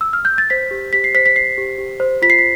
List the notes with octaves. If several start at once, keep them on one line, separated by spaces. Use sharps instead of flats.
E6
F6
G6
A6
C5 B6
G4
G4 B6
C7
C5 B6
B6
C5 C7
G4
G4
C5
F4 B6
C7
B6